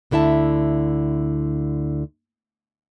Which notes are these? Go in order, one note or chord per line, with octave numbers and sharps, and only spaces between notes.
D2 D3 E4 E5 A5